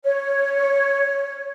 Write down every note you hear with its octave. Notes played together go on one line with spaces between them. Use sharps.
C#5